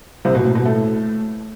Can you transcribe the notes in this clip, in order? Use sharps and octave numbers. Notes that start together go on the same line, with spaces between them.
C2 C3
B2
A2
B2
A2 A3